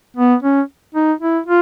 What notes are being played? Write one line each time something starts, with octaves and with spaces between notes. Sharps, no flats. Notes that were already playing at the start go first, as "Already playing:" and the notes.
B3
C#4
D#4
E4
F4